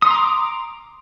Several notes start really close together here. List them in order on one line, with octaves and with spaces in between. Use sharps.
D#6 C6 A#5 D6